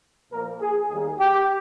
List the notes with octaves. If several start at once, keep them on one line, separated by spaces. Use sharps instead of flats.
A#2 F3 A#3 A#4
G#4
D#2 D#3 G3 A#3 G#4
G4